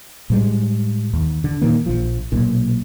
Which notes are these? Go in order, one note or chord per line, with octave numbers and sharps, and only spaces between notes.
A2 G3 G#3
D#2
D3
A#2 D#3 A#3
A#1 F3
B1 A#2